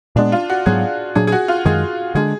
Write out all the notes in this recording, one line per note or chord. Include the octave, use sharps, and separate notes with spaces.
A#2 G#3 B3 D4
F4
F#4
G#2 F#3 B3 G#4
A#2 F#3 D4 G#4
G#4
F#4
F4
F#2 D#3 G#3 G#4
D3 G#3 D4 G#4